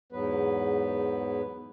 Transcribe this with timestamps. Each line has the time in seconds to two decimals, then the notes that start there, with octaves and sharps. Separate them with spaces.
0.12 E2 G#2 F#3 B3 B4